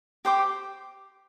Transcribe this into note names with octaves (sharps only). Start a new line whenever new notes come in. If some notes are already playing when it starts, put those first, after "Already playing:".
G4 C5 G5 D6